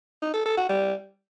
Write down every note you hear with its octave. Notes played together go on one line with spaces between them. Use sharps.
D#4
A4
A4
F#4
G3